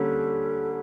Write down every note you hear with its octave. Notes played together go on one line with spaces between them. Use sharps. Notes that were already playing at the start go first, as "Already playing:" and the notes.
Already playing: D3 G3 A#3 C#4 A4